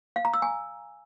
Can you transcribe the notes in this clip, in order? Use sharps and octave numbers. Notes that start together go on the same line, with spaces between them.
F5
A#5
E6
G#5